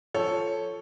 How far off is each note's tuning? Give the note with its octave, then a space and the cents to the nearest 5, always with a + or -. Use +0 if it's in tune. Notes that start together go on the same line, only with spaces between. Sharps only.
F3 +0 A4 +0 C#5 +0